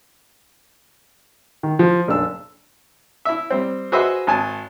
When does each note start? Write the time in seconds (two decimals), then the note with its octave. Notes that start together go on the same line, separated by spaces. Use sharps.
1.63 D#3
1.79 F3
2.07 F#1 B1 D4 E6
3.25 E4 E5
3.50 G3 C4
3.92 F#4 G#4 B4 C5 D#5 E5
4.27 G#1 G#5 A5